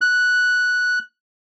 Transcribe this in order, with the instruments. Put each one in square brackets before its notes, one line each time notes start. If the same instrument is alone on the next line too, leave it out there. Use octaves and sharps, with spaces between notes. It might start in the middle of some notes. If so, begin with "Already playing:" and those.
[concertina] F#6